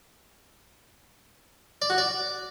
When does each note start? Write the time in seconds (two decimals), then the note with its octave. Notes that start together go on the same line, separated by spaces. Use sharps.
1.82 D5
1.90 F#4
1.98 D5